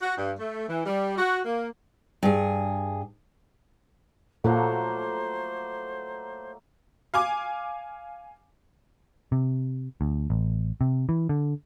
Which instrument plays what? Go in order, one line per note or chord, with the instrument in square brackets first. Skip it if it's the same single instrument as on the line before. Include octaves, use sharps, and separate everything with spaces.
[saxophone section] F#4
G2
A3
E3
G3
F#4
A#3
[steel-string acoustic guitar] G2 G#4
[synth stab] A#2 [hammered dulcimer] F#3 A3 A#3 [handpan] F4 A4 F#5 [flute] C5
[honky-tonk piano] F5 G#5 D6
[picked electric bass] C3
D2
A1
C3
E3
D3